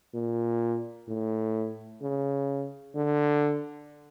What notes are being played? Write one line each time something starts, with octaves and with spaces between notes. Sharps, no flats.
A#2
A2
C#3
D3